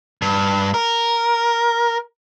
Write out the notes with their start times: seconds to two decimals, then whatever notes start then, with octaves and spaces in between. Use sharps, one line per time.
0.22 G2
0.74 A#4